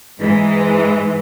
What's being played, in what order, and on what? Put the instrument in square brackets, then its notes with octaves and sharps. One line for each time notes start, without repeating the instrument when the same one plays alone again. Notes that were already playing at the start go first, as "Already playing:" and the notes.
[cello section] G#2 E3 G#3